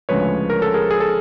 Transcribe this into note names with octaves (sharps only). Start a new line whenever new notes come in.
D2 C#3 F3 G#3 B4 C#5
A#4
A4
G#4 A#4
G#4
A4